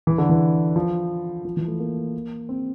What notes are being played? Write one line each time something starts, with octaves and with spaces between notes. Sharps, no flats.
E3
D3
E3
F3
F3
E3
A3
A#3
C4